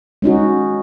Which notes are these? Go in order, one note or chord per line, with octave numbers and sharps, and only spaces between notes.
G#3 C#4 D#4 F#4